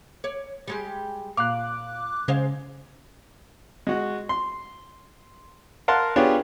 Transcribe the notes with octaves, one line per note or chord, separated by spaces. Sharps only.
C#5 D5
G3 G#3 G4
A#2 F5 D6 F#6
C#3 G#3 C5 F5
G#3 F#4
C6
A#4 F5 F#5 A5 C6
B3 D4 F4 G4 G#4 C#5